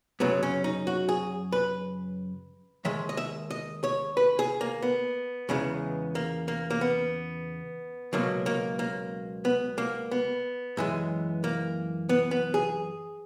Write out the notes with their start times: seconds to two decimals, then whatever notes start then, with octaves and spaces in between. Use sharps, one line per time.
0.20 F#2 C#3 F#3 B3
0.43 C#4
0.64 D#4
0.87 F#4
1.09 G#4
1.52 B4
2.85 D#2 D#3 G#3 E5
3.09 D#5
3.17 E5
3.50 D#5
3.84 C#5
4.17 B4
4.39 G#4
4.61 A#3
4.82 B3
5.49 E2 C#3 E3 G#3
6.15 A#3
6.48 A#3
6.70 A#3
6.81 B3
8.13 C#2 B2 F#3 A#3
8.46 A#3
8.79 A#3
9.45 B3
9.78 A#3
10.11 B3
10.77 F#2 E3 G#3
11.44 A#3
12.09 B3
12.31 B3
12.54 G#4